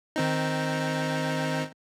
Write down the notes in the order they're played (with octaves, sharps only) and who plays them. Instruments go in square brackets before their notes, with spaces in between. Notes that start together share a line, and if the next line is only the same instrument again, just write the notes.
[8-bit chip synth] D#3 C4 D#4